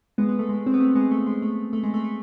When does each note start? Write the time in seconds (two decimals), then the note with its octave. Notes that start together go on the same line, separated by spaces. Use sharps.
0.18 G#3 B3
0.29 G#3 B3
0.39 A3
0.49 G#3
0.67 C4
0.74 B3
0.80 A3
0.95 G#3 B3
1.11 A3
1.27 G#3
1.42 A3
1.73 A3
1.83 G#3
1.94 A3
2.04 A3